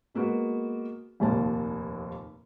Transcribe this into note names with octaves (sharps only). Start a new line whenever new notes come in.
G#3 A#3 B3 F#4
F1 D#2 A#2 A#3 A5